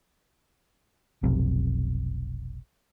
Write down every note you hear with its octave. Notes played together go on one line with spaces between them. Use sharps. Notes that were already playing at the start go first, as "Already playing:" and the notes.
F1 B1 C3